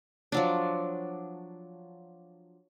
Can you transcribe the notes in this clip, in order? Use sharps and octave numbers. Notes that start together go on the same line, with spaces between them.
F3 F#3 D4